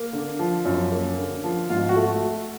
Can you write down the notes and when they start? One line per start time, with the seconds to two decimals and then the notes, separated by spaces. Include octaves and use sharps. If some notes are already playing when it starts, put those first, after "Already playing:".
Already playing: A#3
0.13 D3
0.39 F3
0.65 F#2
0.92 A#3
1.17 D3
1.44 F3
1.70 G#1 F4
1.89 F#4
1.96 A3